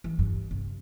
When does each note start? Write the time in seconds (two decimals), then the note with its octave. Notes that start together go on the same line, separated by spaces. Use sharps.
0.04 E3
0.19 G2
0.51 C3